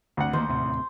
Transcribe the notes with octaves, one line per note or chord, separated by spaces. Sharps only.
D2 F#5
D#3 F3 A#3 C5
D#2 A2 C3